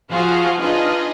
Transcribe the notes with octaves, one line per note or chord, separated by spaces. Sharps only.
F3 F4 F#4 G#4 C5 F5
D4 D#4 F4 G#4 B4 D#5